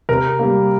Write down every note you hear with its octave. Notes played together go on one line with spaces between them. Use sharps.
C3 A#4
G3 A#3